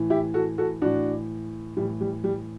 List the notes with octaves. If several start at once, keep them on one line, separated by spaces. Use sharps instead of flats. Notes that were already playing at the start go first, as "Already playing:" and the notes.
Already playing: A2 E3
E4 G4
F#4 A4
F#4 A4
A2 E3 D4 F#4
A2 E3 G3
G3
G3